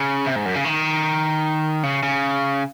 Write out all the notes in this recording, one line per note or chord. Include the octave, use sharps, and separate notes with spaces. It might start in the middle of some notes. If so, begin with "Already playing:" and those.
Already playing: C#3
C3
G#2
F#2
C#3
D#3
C#3
C#3